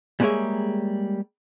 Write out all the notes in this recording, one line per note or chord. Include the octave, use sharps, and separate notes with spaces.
G3 G#3 A#3 G#4 C#5 E5